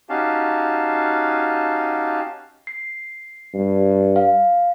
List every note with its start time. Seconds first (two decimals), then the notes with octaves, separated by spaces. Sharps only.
0.09 C#4 D#4 F#4 G4 F5 A5
2.67 C7
3.54 G2
4.16 F5